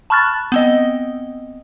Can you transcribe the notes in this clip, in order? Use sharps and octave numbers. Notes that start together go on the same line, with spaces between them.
A5 B5 C#6 F6 F#6 A6
B3 C4 D#5